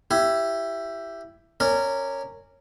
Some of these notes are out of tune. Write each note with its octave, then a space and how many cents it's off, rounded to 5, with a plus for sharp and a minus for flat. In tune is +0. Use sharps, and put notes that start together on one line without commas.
E4 +15 G4 +0
C#4 -5 A#4 -20 D5 +0